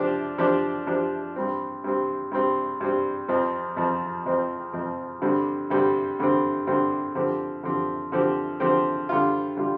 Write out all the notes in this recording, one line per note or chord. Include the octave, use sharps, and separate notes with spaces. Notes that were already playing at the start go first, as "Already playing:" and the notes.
Already playing: F3 D4 G4
F3 D4 G4
F3 D4 G4
G2 G3 C4
G2 G3 C4
G2 G3 C4
G2 G3 C4
F2 F3 C4
F2 F3 C4
F2 F3 C4
F2 F3 C4
G2 D3 G3 C4
G2 D3 G3 C4
G2 D3 G3 C4
G2 D3 G3 C4
D3 F3 C4 G4
D3 F3 C4 G4
D3 F3 C4 G4
D3 F3 C4 G4
D3 G3 F4
D3 G3 F4